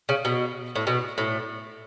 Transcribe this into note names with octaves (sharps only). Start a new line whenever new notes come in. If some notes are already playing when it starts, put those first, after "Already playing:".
C#3
B2
A2
B2
A2